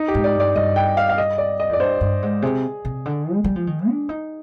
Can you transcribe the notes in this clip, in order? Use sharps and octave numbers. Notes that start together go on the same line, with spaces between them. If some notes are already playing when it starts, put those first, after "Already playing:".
Already playing: D#4
G4
G#2
D5
G2
D5
G2 D#5
G5
F5
F5
D#5
D5
D#5
F2 D5
G2 C5
G2
G#2
C3 G#4
C3
D3
G#3
G3
F3
D#3
D4
D#4